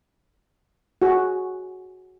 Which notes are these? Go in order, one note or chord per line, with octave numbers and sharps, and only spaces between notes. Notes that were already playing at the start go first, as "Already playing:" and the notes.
F#4 G#4